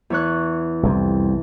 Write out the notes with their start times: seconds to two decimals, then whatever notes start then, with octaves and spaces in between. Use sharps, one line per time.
0.10 E2 C#5 F#6
0.83 C2 F2